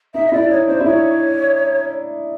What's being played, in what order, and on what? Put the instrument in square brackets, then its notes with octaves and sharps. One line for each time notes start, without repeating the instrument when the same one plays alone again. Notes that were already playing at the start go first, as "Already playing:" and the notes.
[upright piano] D#4 [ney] E5
[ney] D#5
[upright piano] E4 [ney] D5
[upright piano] D#4 [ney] C#5
[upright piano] D4 [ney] C5
[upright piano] E4
[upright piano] D#4 [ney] C#5